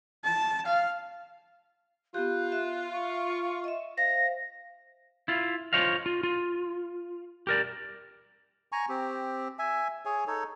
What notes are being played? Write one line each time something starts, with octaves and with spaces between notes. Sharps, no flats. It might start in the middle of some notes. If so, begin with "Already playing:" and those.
A5
F5
B3 F4 G4 F#6
E5
C#6
D#5 E5
C5 F5 A#6
E4 F4
F4 C5 C#5 D#5 F5
F4
F4
G4 A#4 D5
G#5 A#5 C#6
C4 G4
E5 G#5
G#4 C#5 G#5
D#4 A4 C#5